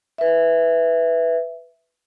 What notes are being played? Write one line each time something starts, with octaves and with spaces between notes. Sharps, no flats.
B4 E5